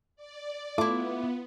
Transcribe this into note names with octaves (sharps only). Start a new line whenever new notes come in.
D5
A3 B3 E4 F4 D6